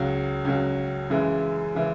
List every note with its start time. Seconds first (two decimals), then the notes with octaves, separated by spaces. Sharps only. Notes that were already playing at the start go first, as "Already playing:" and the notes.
Already playing: C#2 C#3 F#3
0.45 C#2 C#3 F#3
1.10 F#2 C#3 E3 G#3
1.75 C#3 E3 G#3